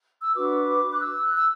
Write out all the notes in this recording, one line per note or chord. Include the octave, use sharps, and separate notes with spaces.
E6
D4 F#4 B4 D6
F#6
E6
F#6
E6